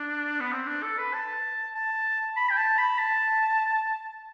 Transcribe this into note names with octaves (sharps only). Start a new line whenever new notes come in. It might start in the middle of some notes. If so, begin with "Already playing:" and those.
Already playing: D4
B3
C4
D4
A4
B4
A5
A5
B5
G5
A5
B5
A5